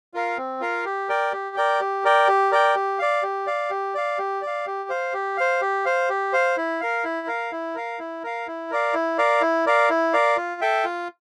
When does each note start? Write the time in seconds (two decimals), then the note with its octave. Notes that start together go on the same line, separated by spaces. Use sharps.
0.14 F4 A#4 F5
0.38 C4
0.61 F4 A#4 F5
0.85 G4
1.09 A#4 D5 G5
1.32 G4
1.56 A#4 D5 G5
1.80 G4
2.04 A#4 D5 G5
2.28 G4
2.51 A#4 D5 G5
2.75 G4
2.99 D5 F5
3.23 G4
3.47 D5 F5
3.70 G4
3.95 D5 F5
4.18 G4
4.42 D5 F5
4.66 G4
4.90 C5 F5
5.13 G4
5.37 C5 F5
5.61 G4
5.85 C5 F5
6.09 G4
6.33 C5 F5
6.57 E4
6.81 A#4 F5
7.04 E4
7.27 A#4 F5
7.52 E4
7.75 A#4 F5
7.99 E4
8.24 A#4 F5
8.47 E4
8.71 A#4 D5 F5
8.94 E4
9.18 A#4 D5 F5
9.41 E4
9.66 A#4 D5 F5
9.90 E4
10.13 A#4 D5 F5
10.37 F4
10.61 A4 E5 G5
10.84 F4